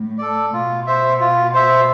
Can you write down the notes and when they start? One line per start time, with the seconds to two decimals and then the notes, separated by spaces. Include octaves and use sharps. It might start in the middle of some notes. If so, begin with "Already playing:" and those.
Already playing: A2
0.18 A4 D5
0.52 B2 F4
0.86 C5 E5
1.20 F4
1.54 C5 E5